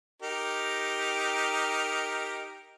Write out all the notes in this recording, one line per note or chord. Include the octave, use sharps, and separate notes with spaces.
D#4 G4 A#4